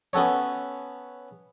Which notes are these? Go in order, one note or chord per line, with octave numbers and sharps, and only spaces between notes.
B3 C#4 F#4 A4 C#5